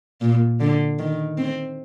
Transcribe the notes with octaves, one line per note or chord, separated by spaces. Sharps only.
A#2
D3
D#3
C4